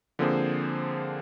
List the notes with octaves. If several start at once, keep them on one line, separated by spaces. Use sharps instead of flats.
D3 F3 A#3 C4 G#4 C5